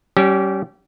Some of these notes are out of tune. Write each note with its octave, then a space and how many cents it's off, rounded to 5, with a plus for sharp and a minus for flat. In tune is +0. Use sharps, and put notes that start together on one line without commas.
G3 -25 C#4 +0 G4 -25